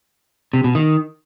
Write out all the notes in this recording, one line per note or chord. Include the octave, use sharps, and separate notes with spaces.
C3
B2
D#3